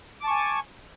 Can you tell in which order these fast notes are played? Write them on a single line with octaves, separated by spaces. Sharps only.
D6 A5 C#6 G#5